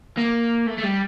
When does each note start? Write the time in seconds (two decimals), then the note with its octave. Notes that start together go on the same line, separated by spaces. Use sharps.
0.18 A#3
0.67 A3
0.78 A3
0.83 G3